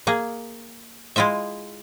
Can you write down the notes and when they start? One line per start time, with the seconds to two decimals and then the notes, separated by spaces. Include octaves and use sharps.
0.07 A#3 G#4
1.16 G#3 E4 F4 D#5 E5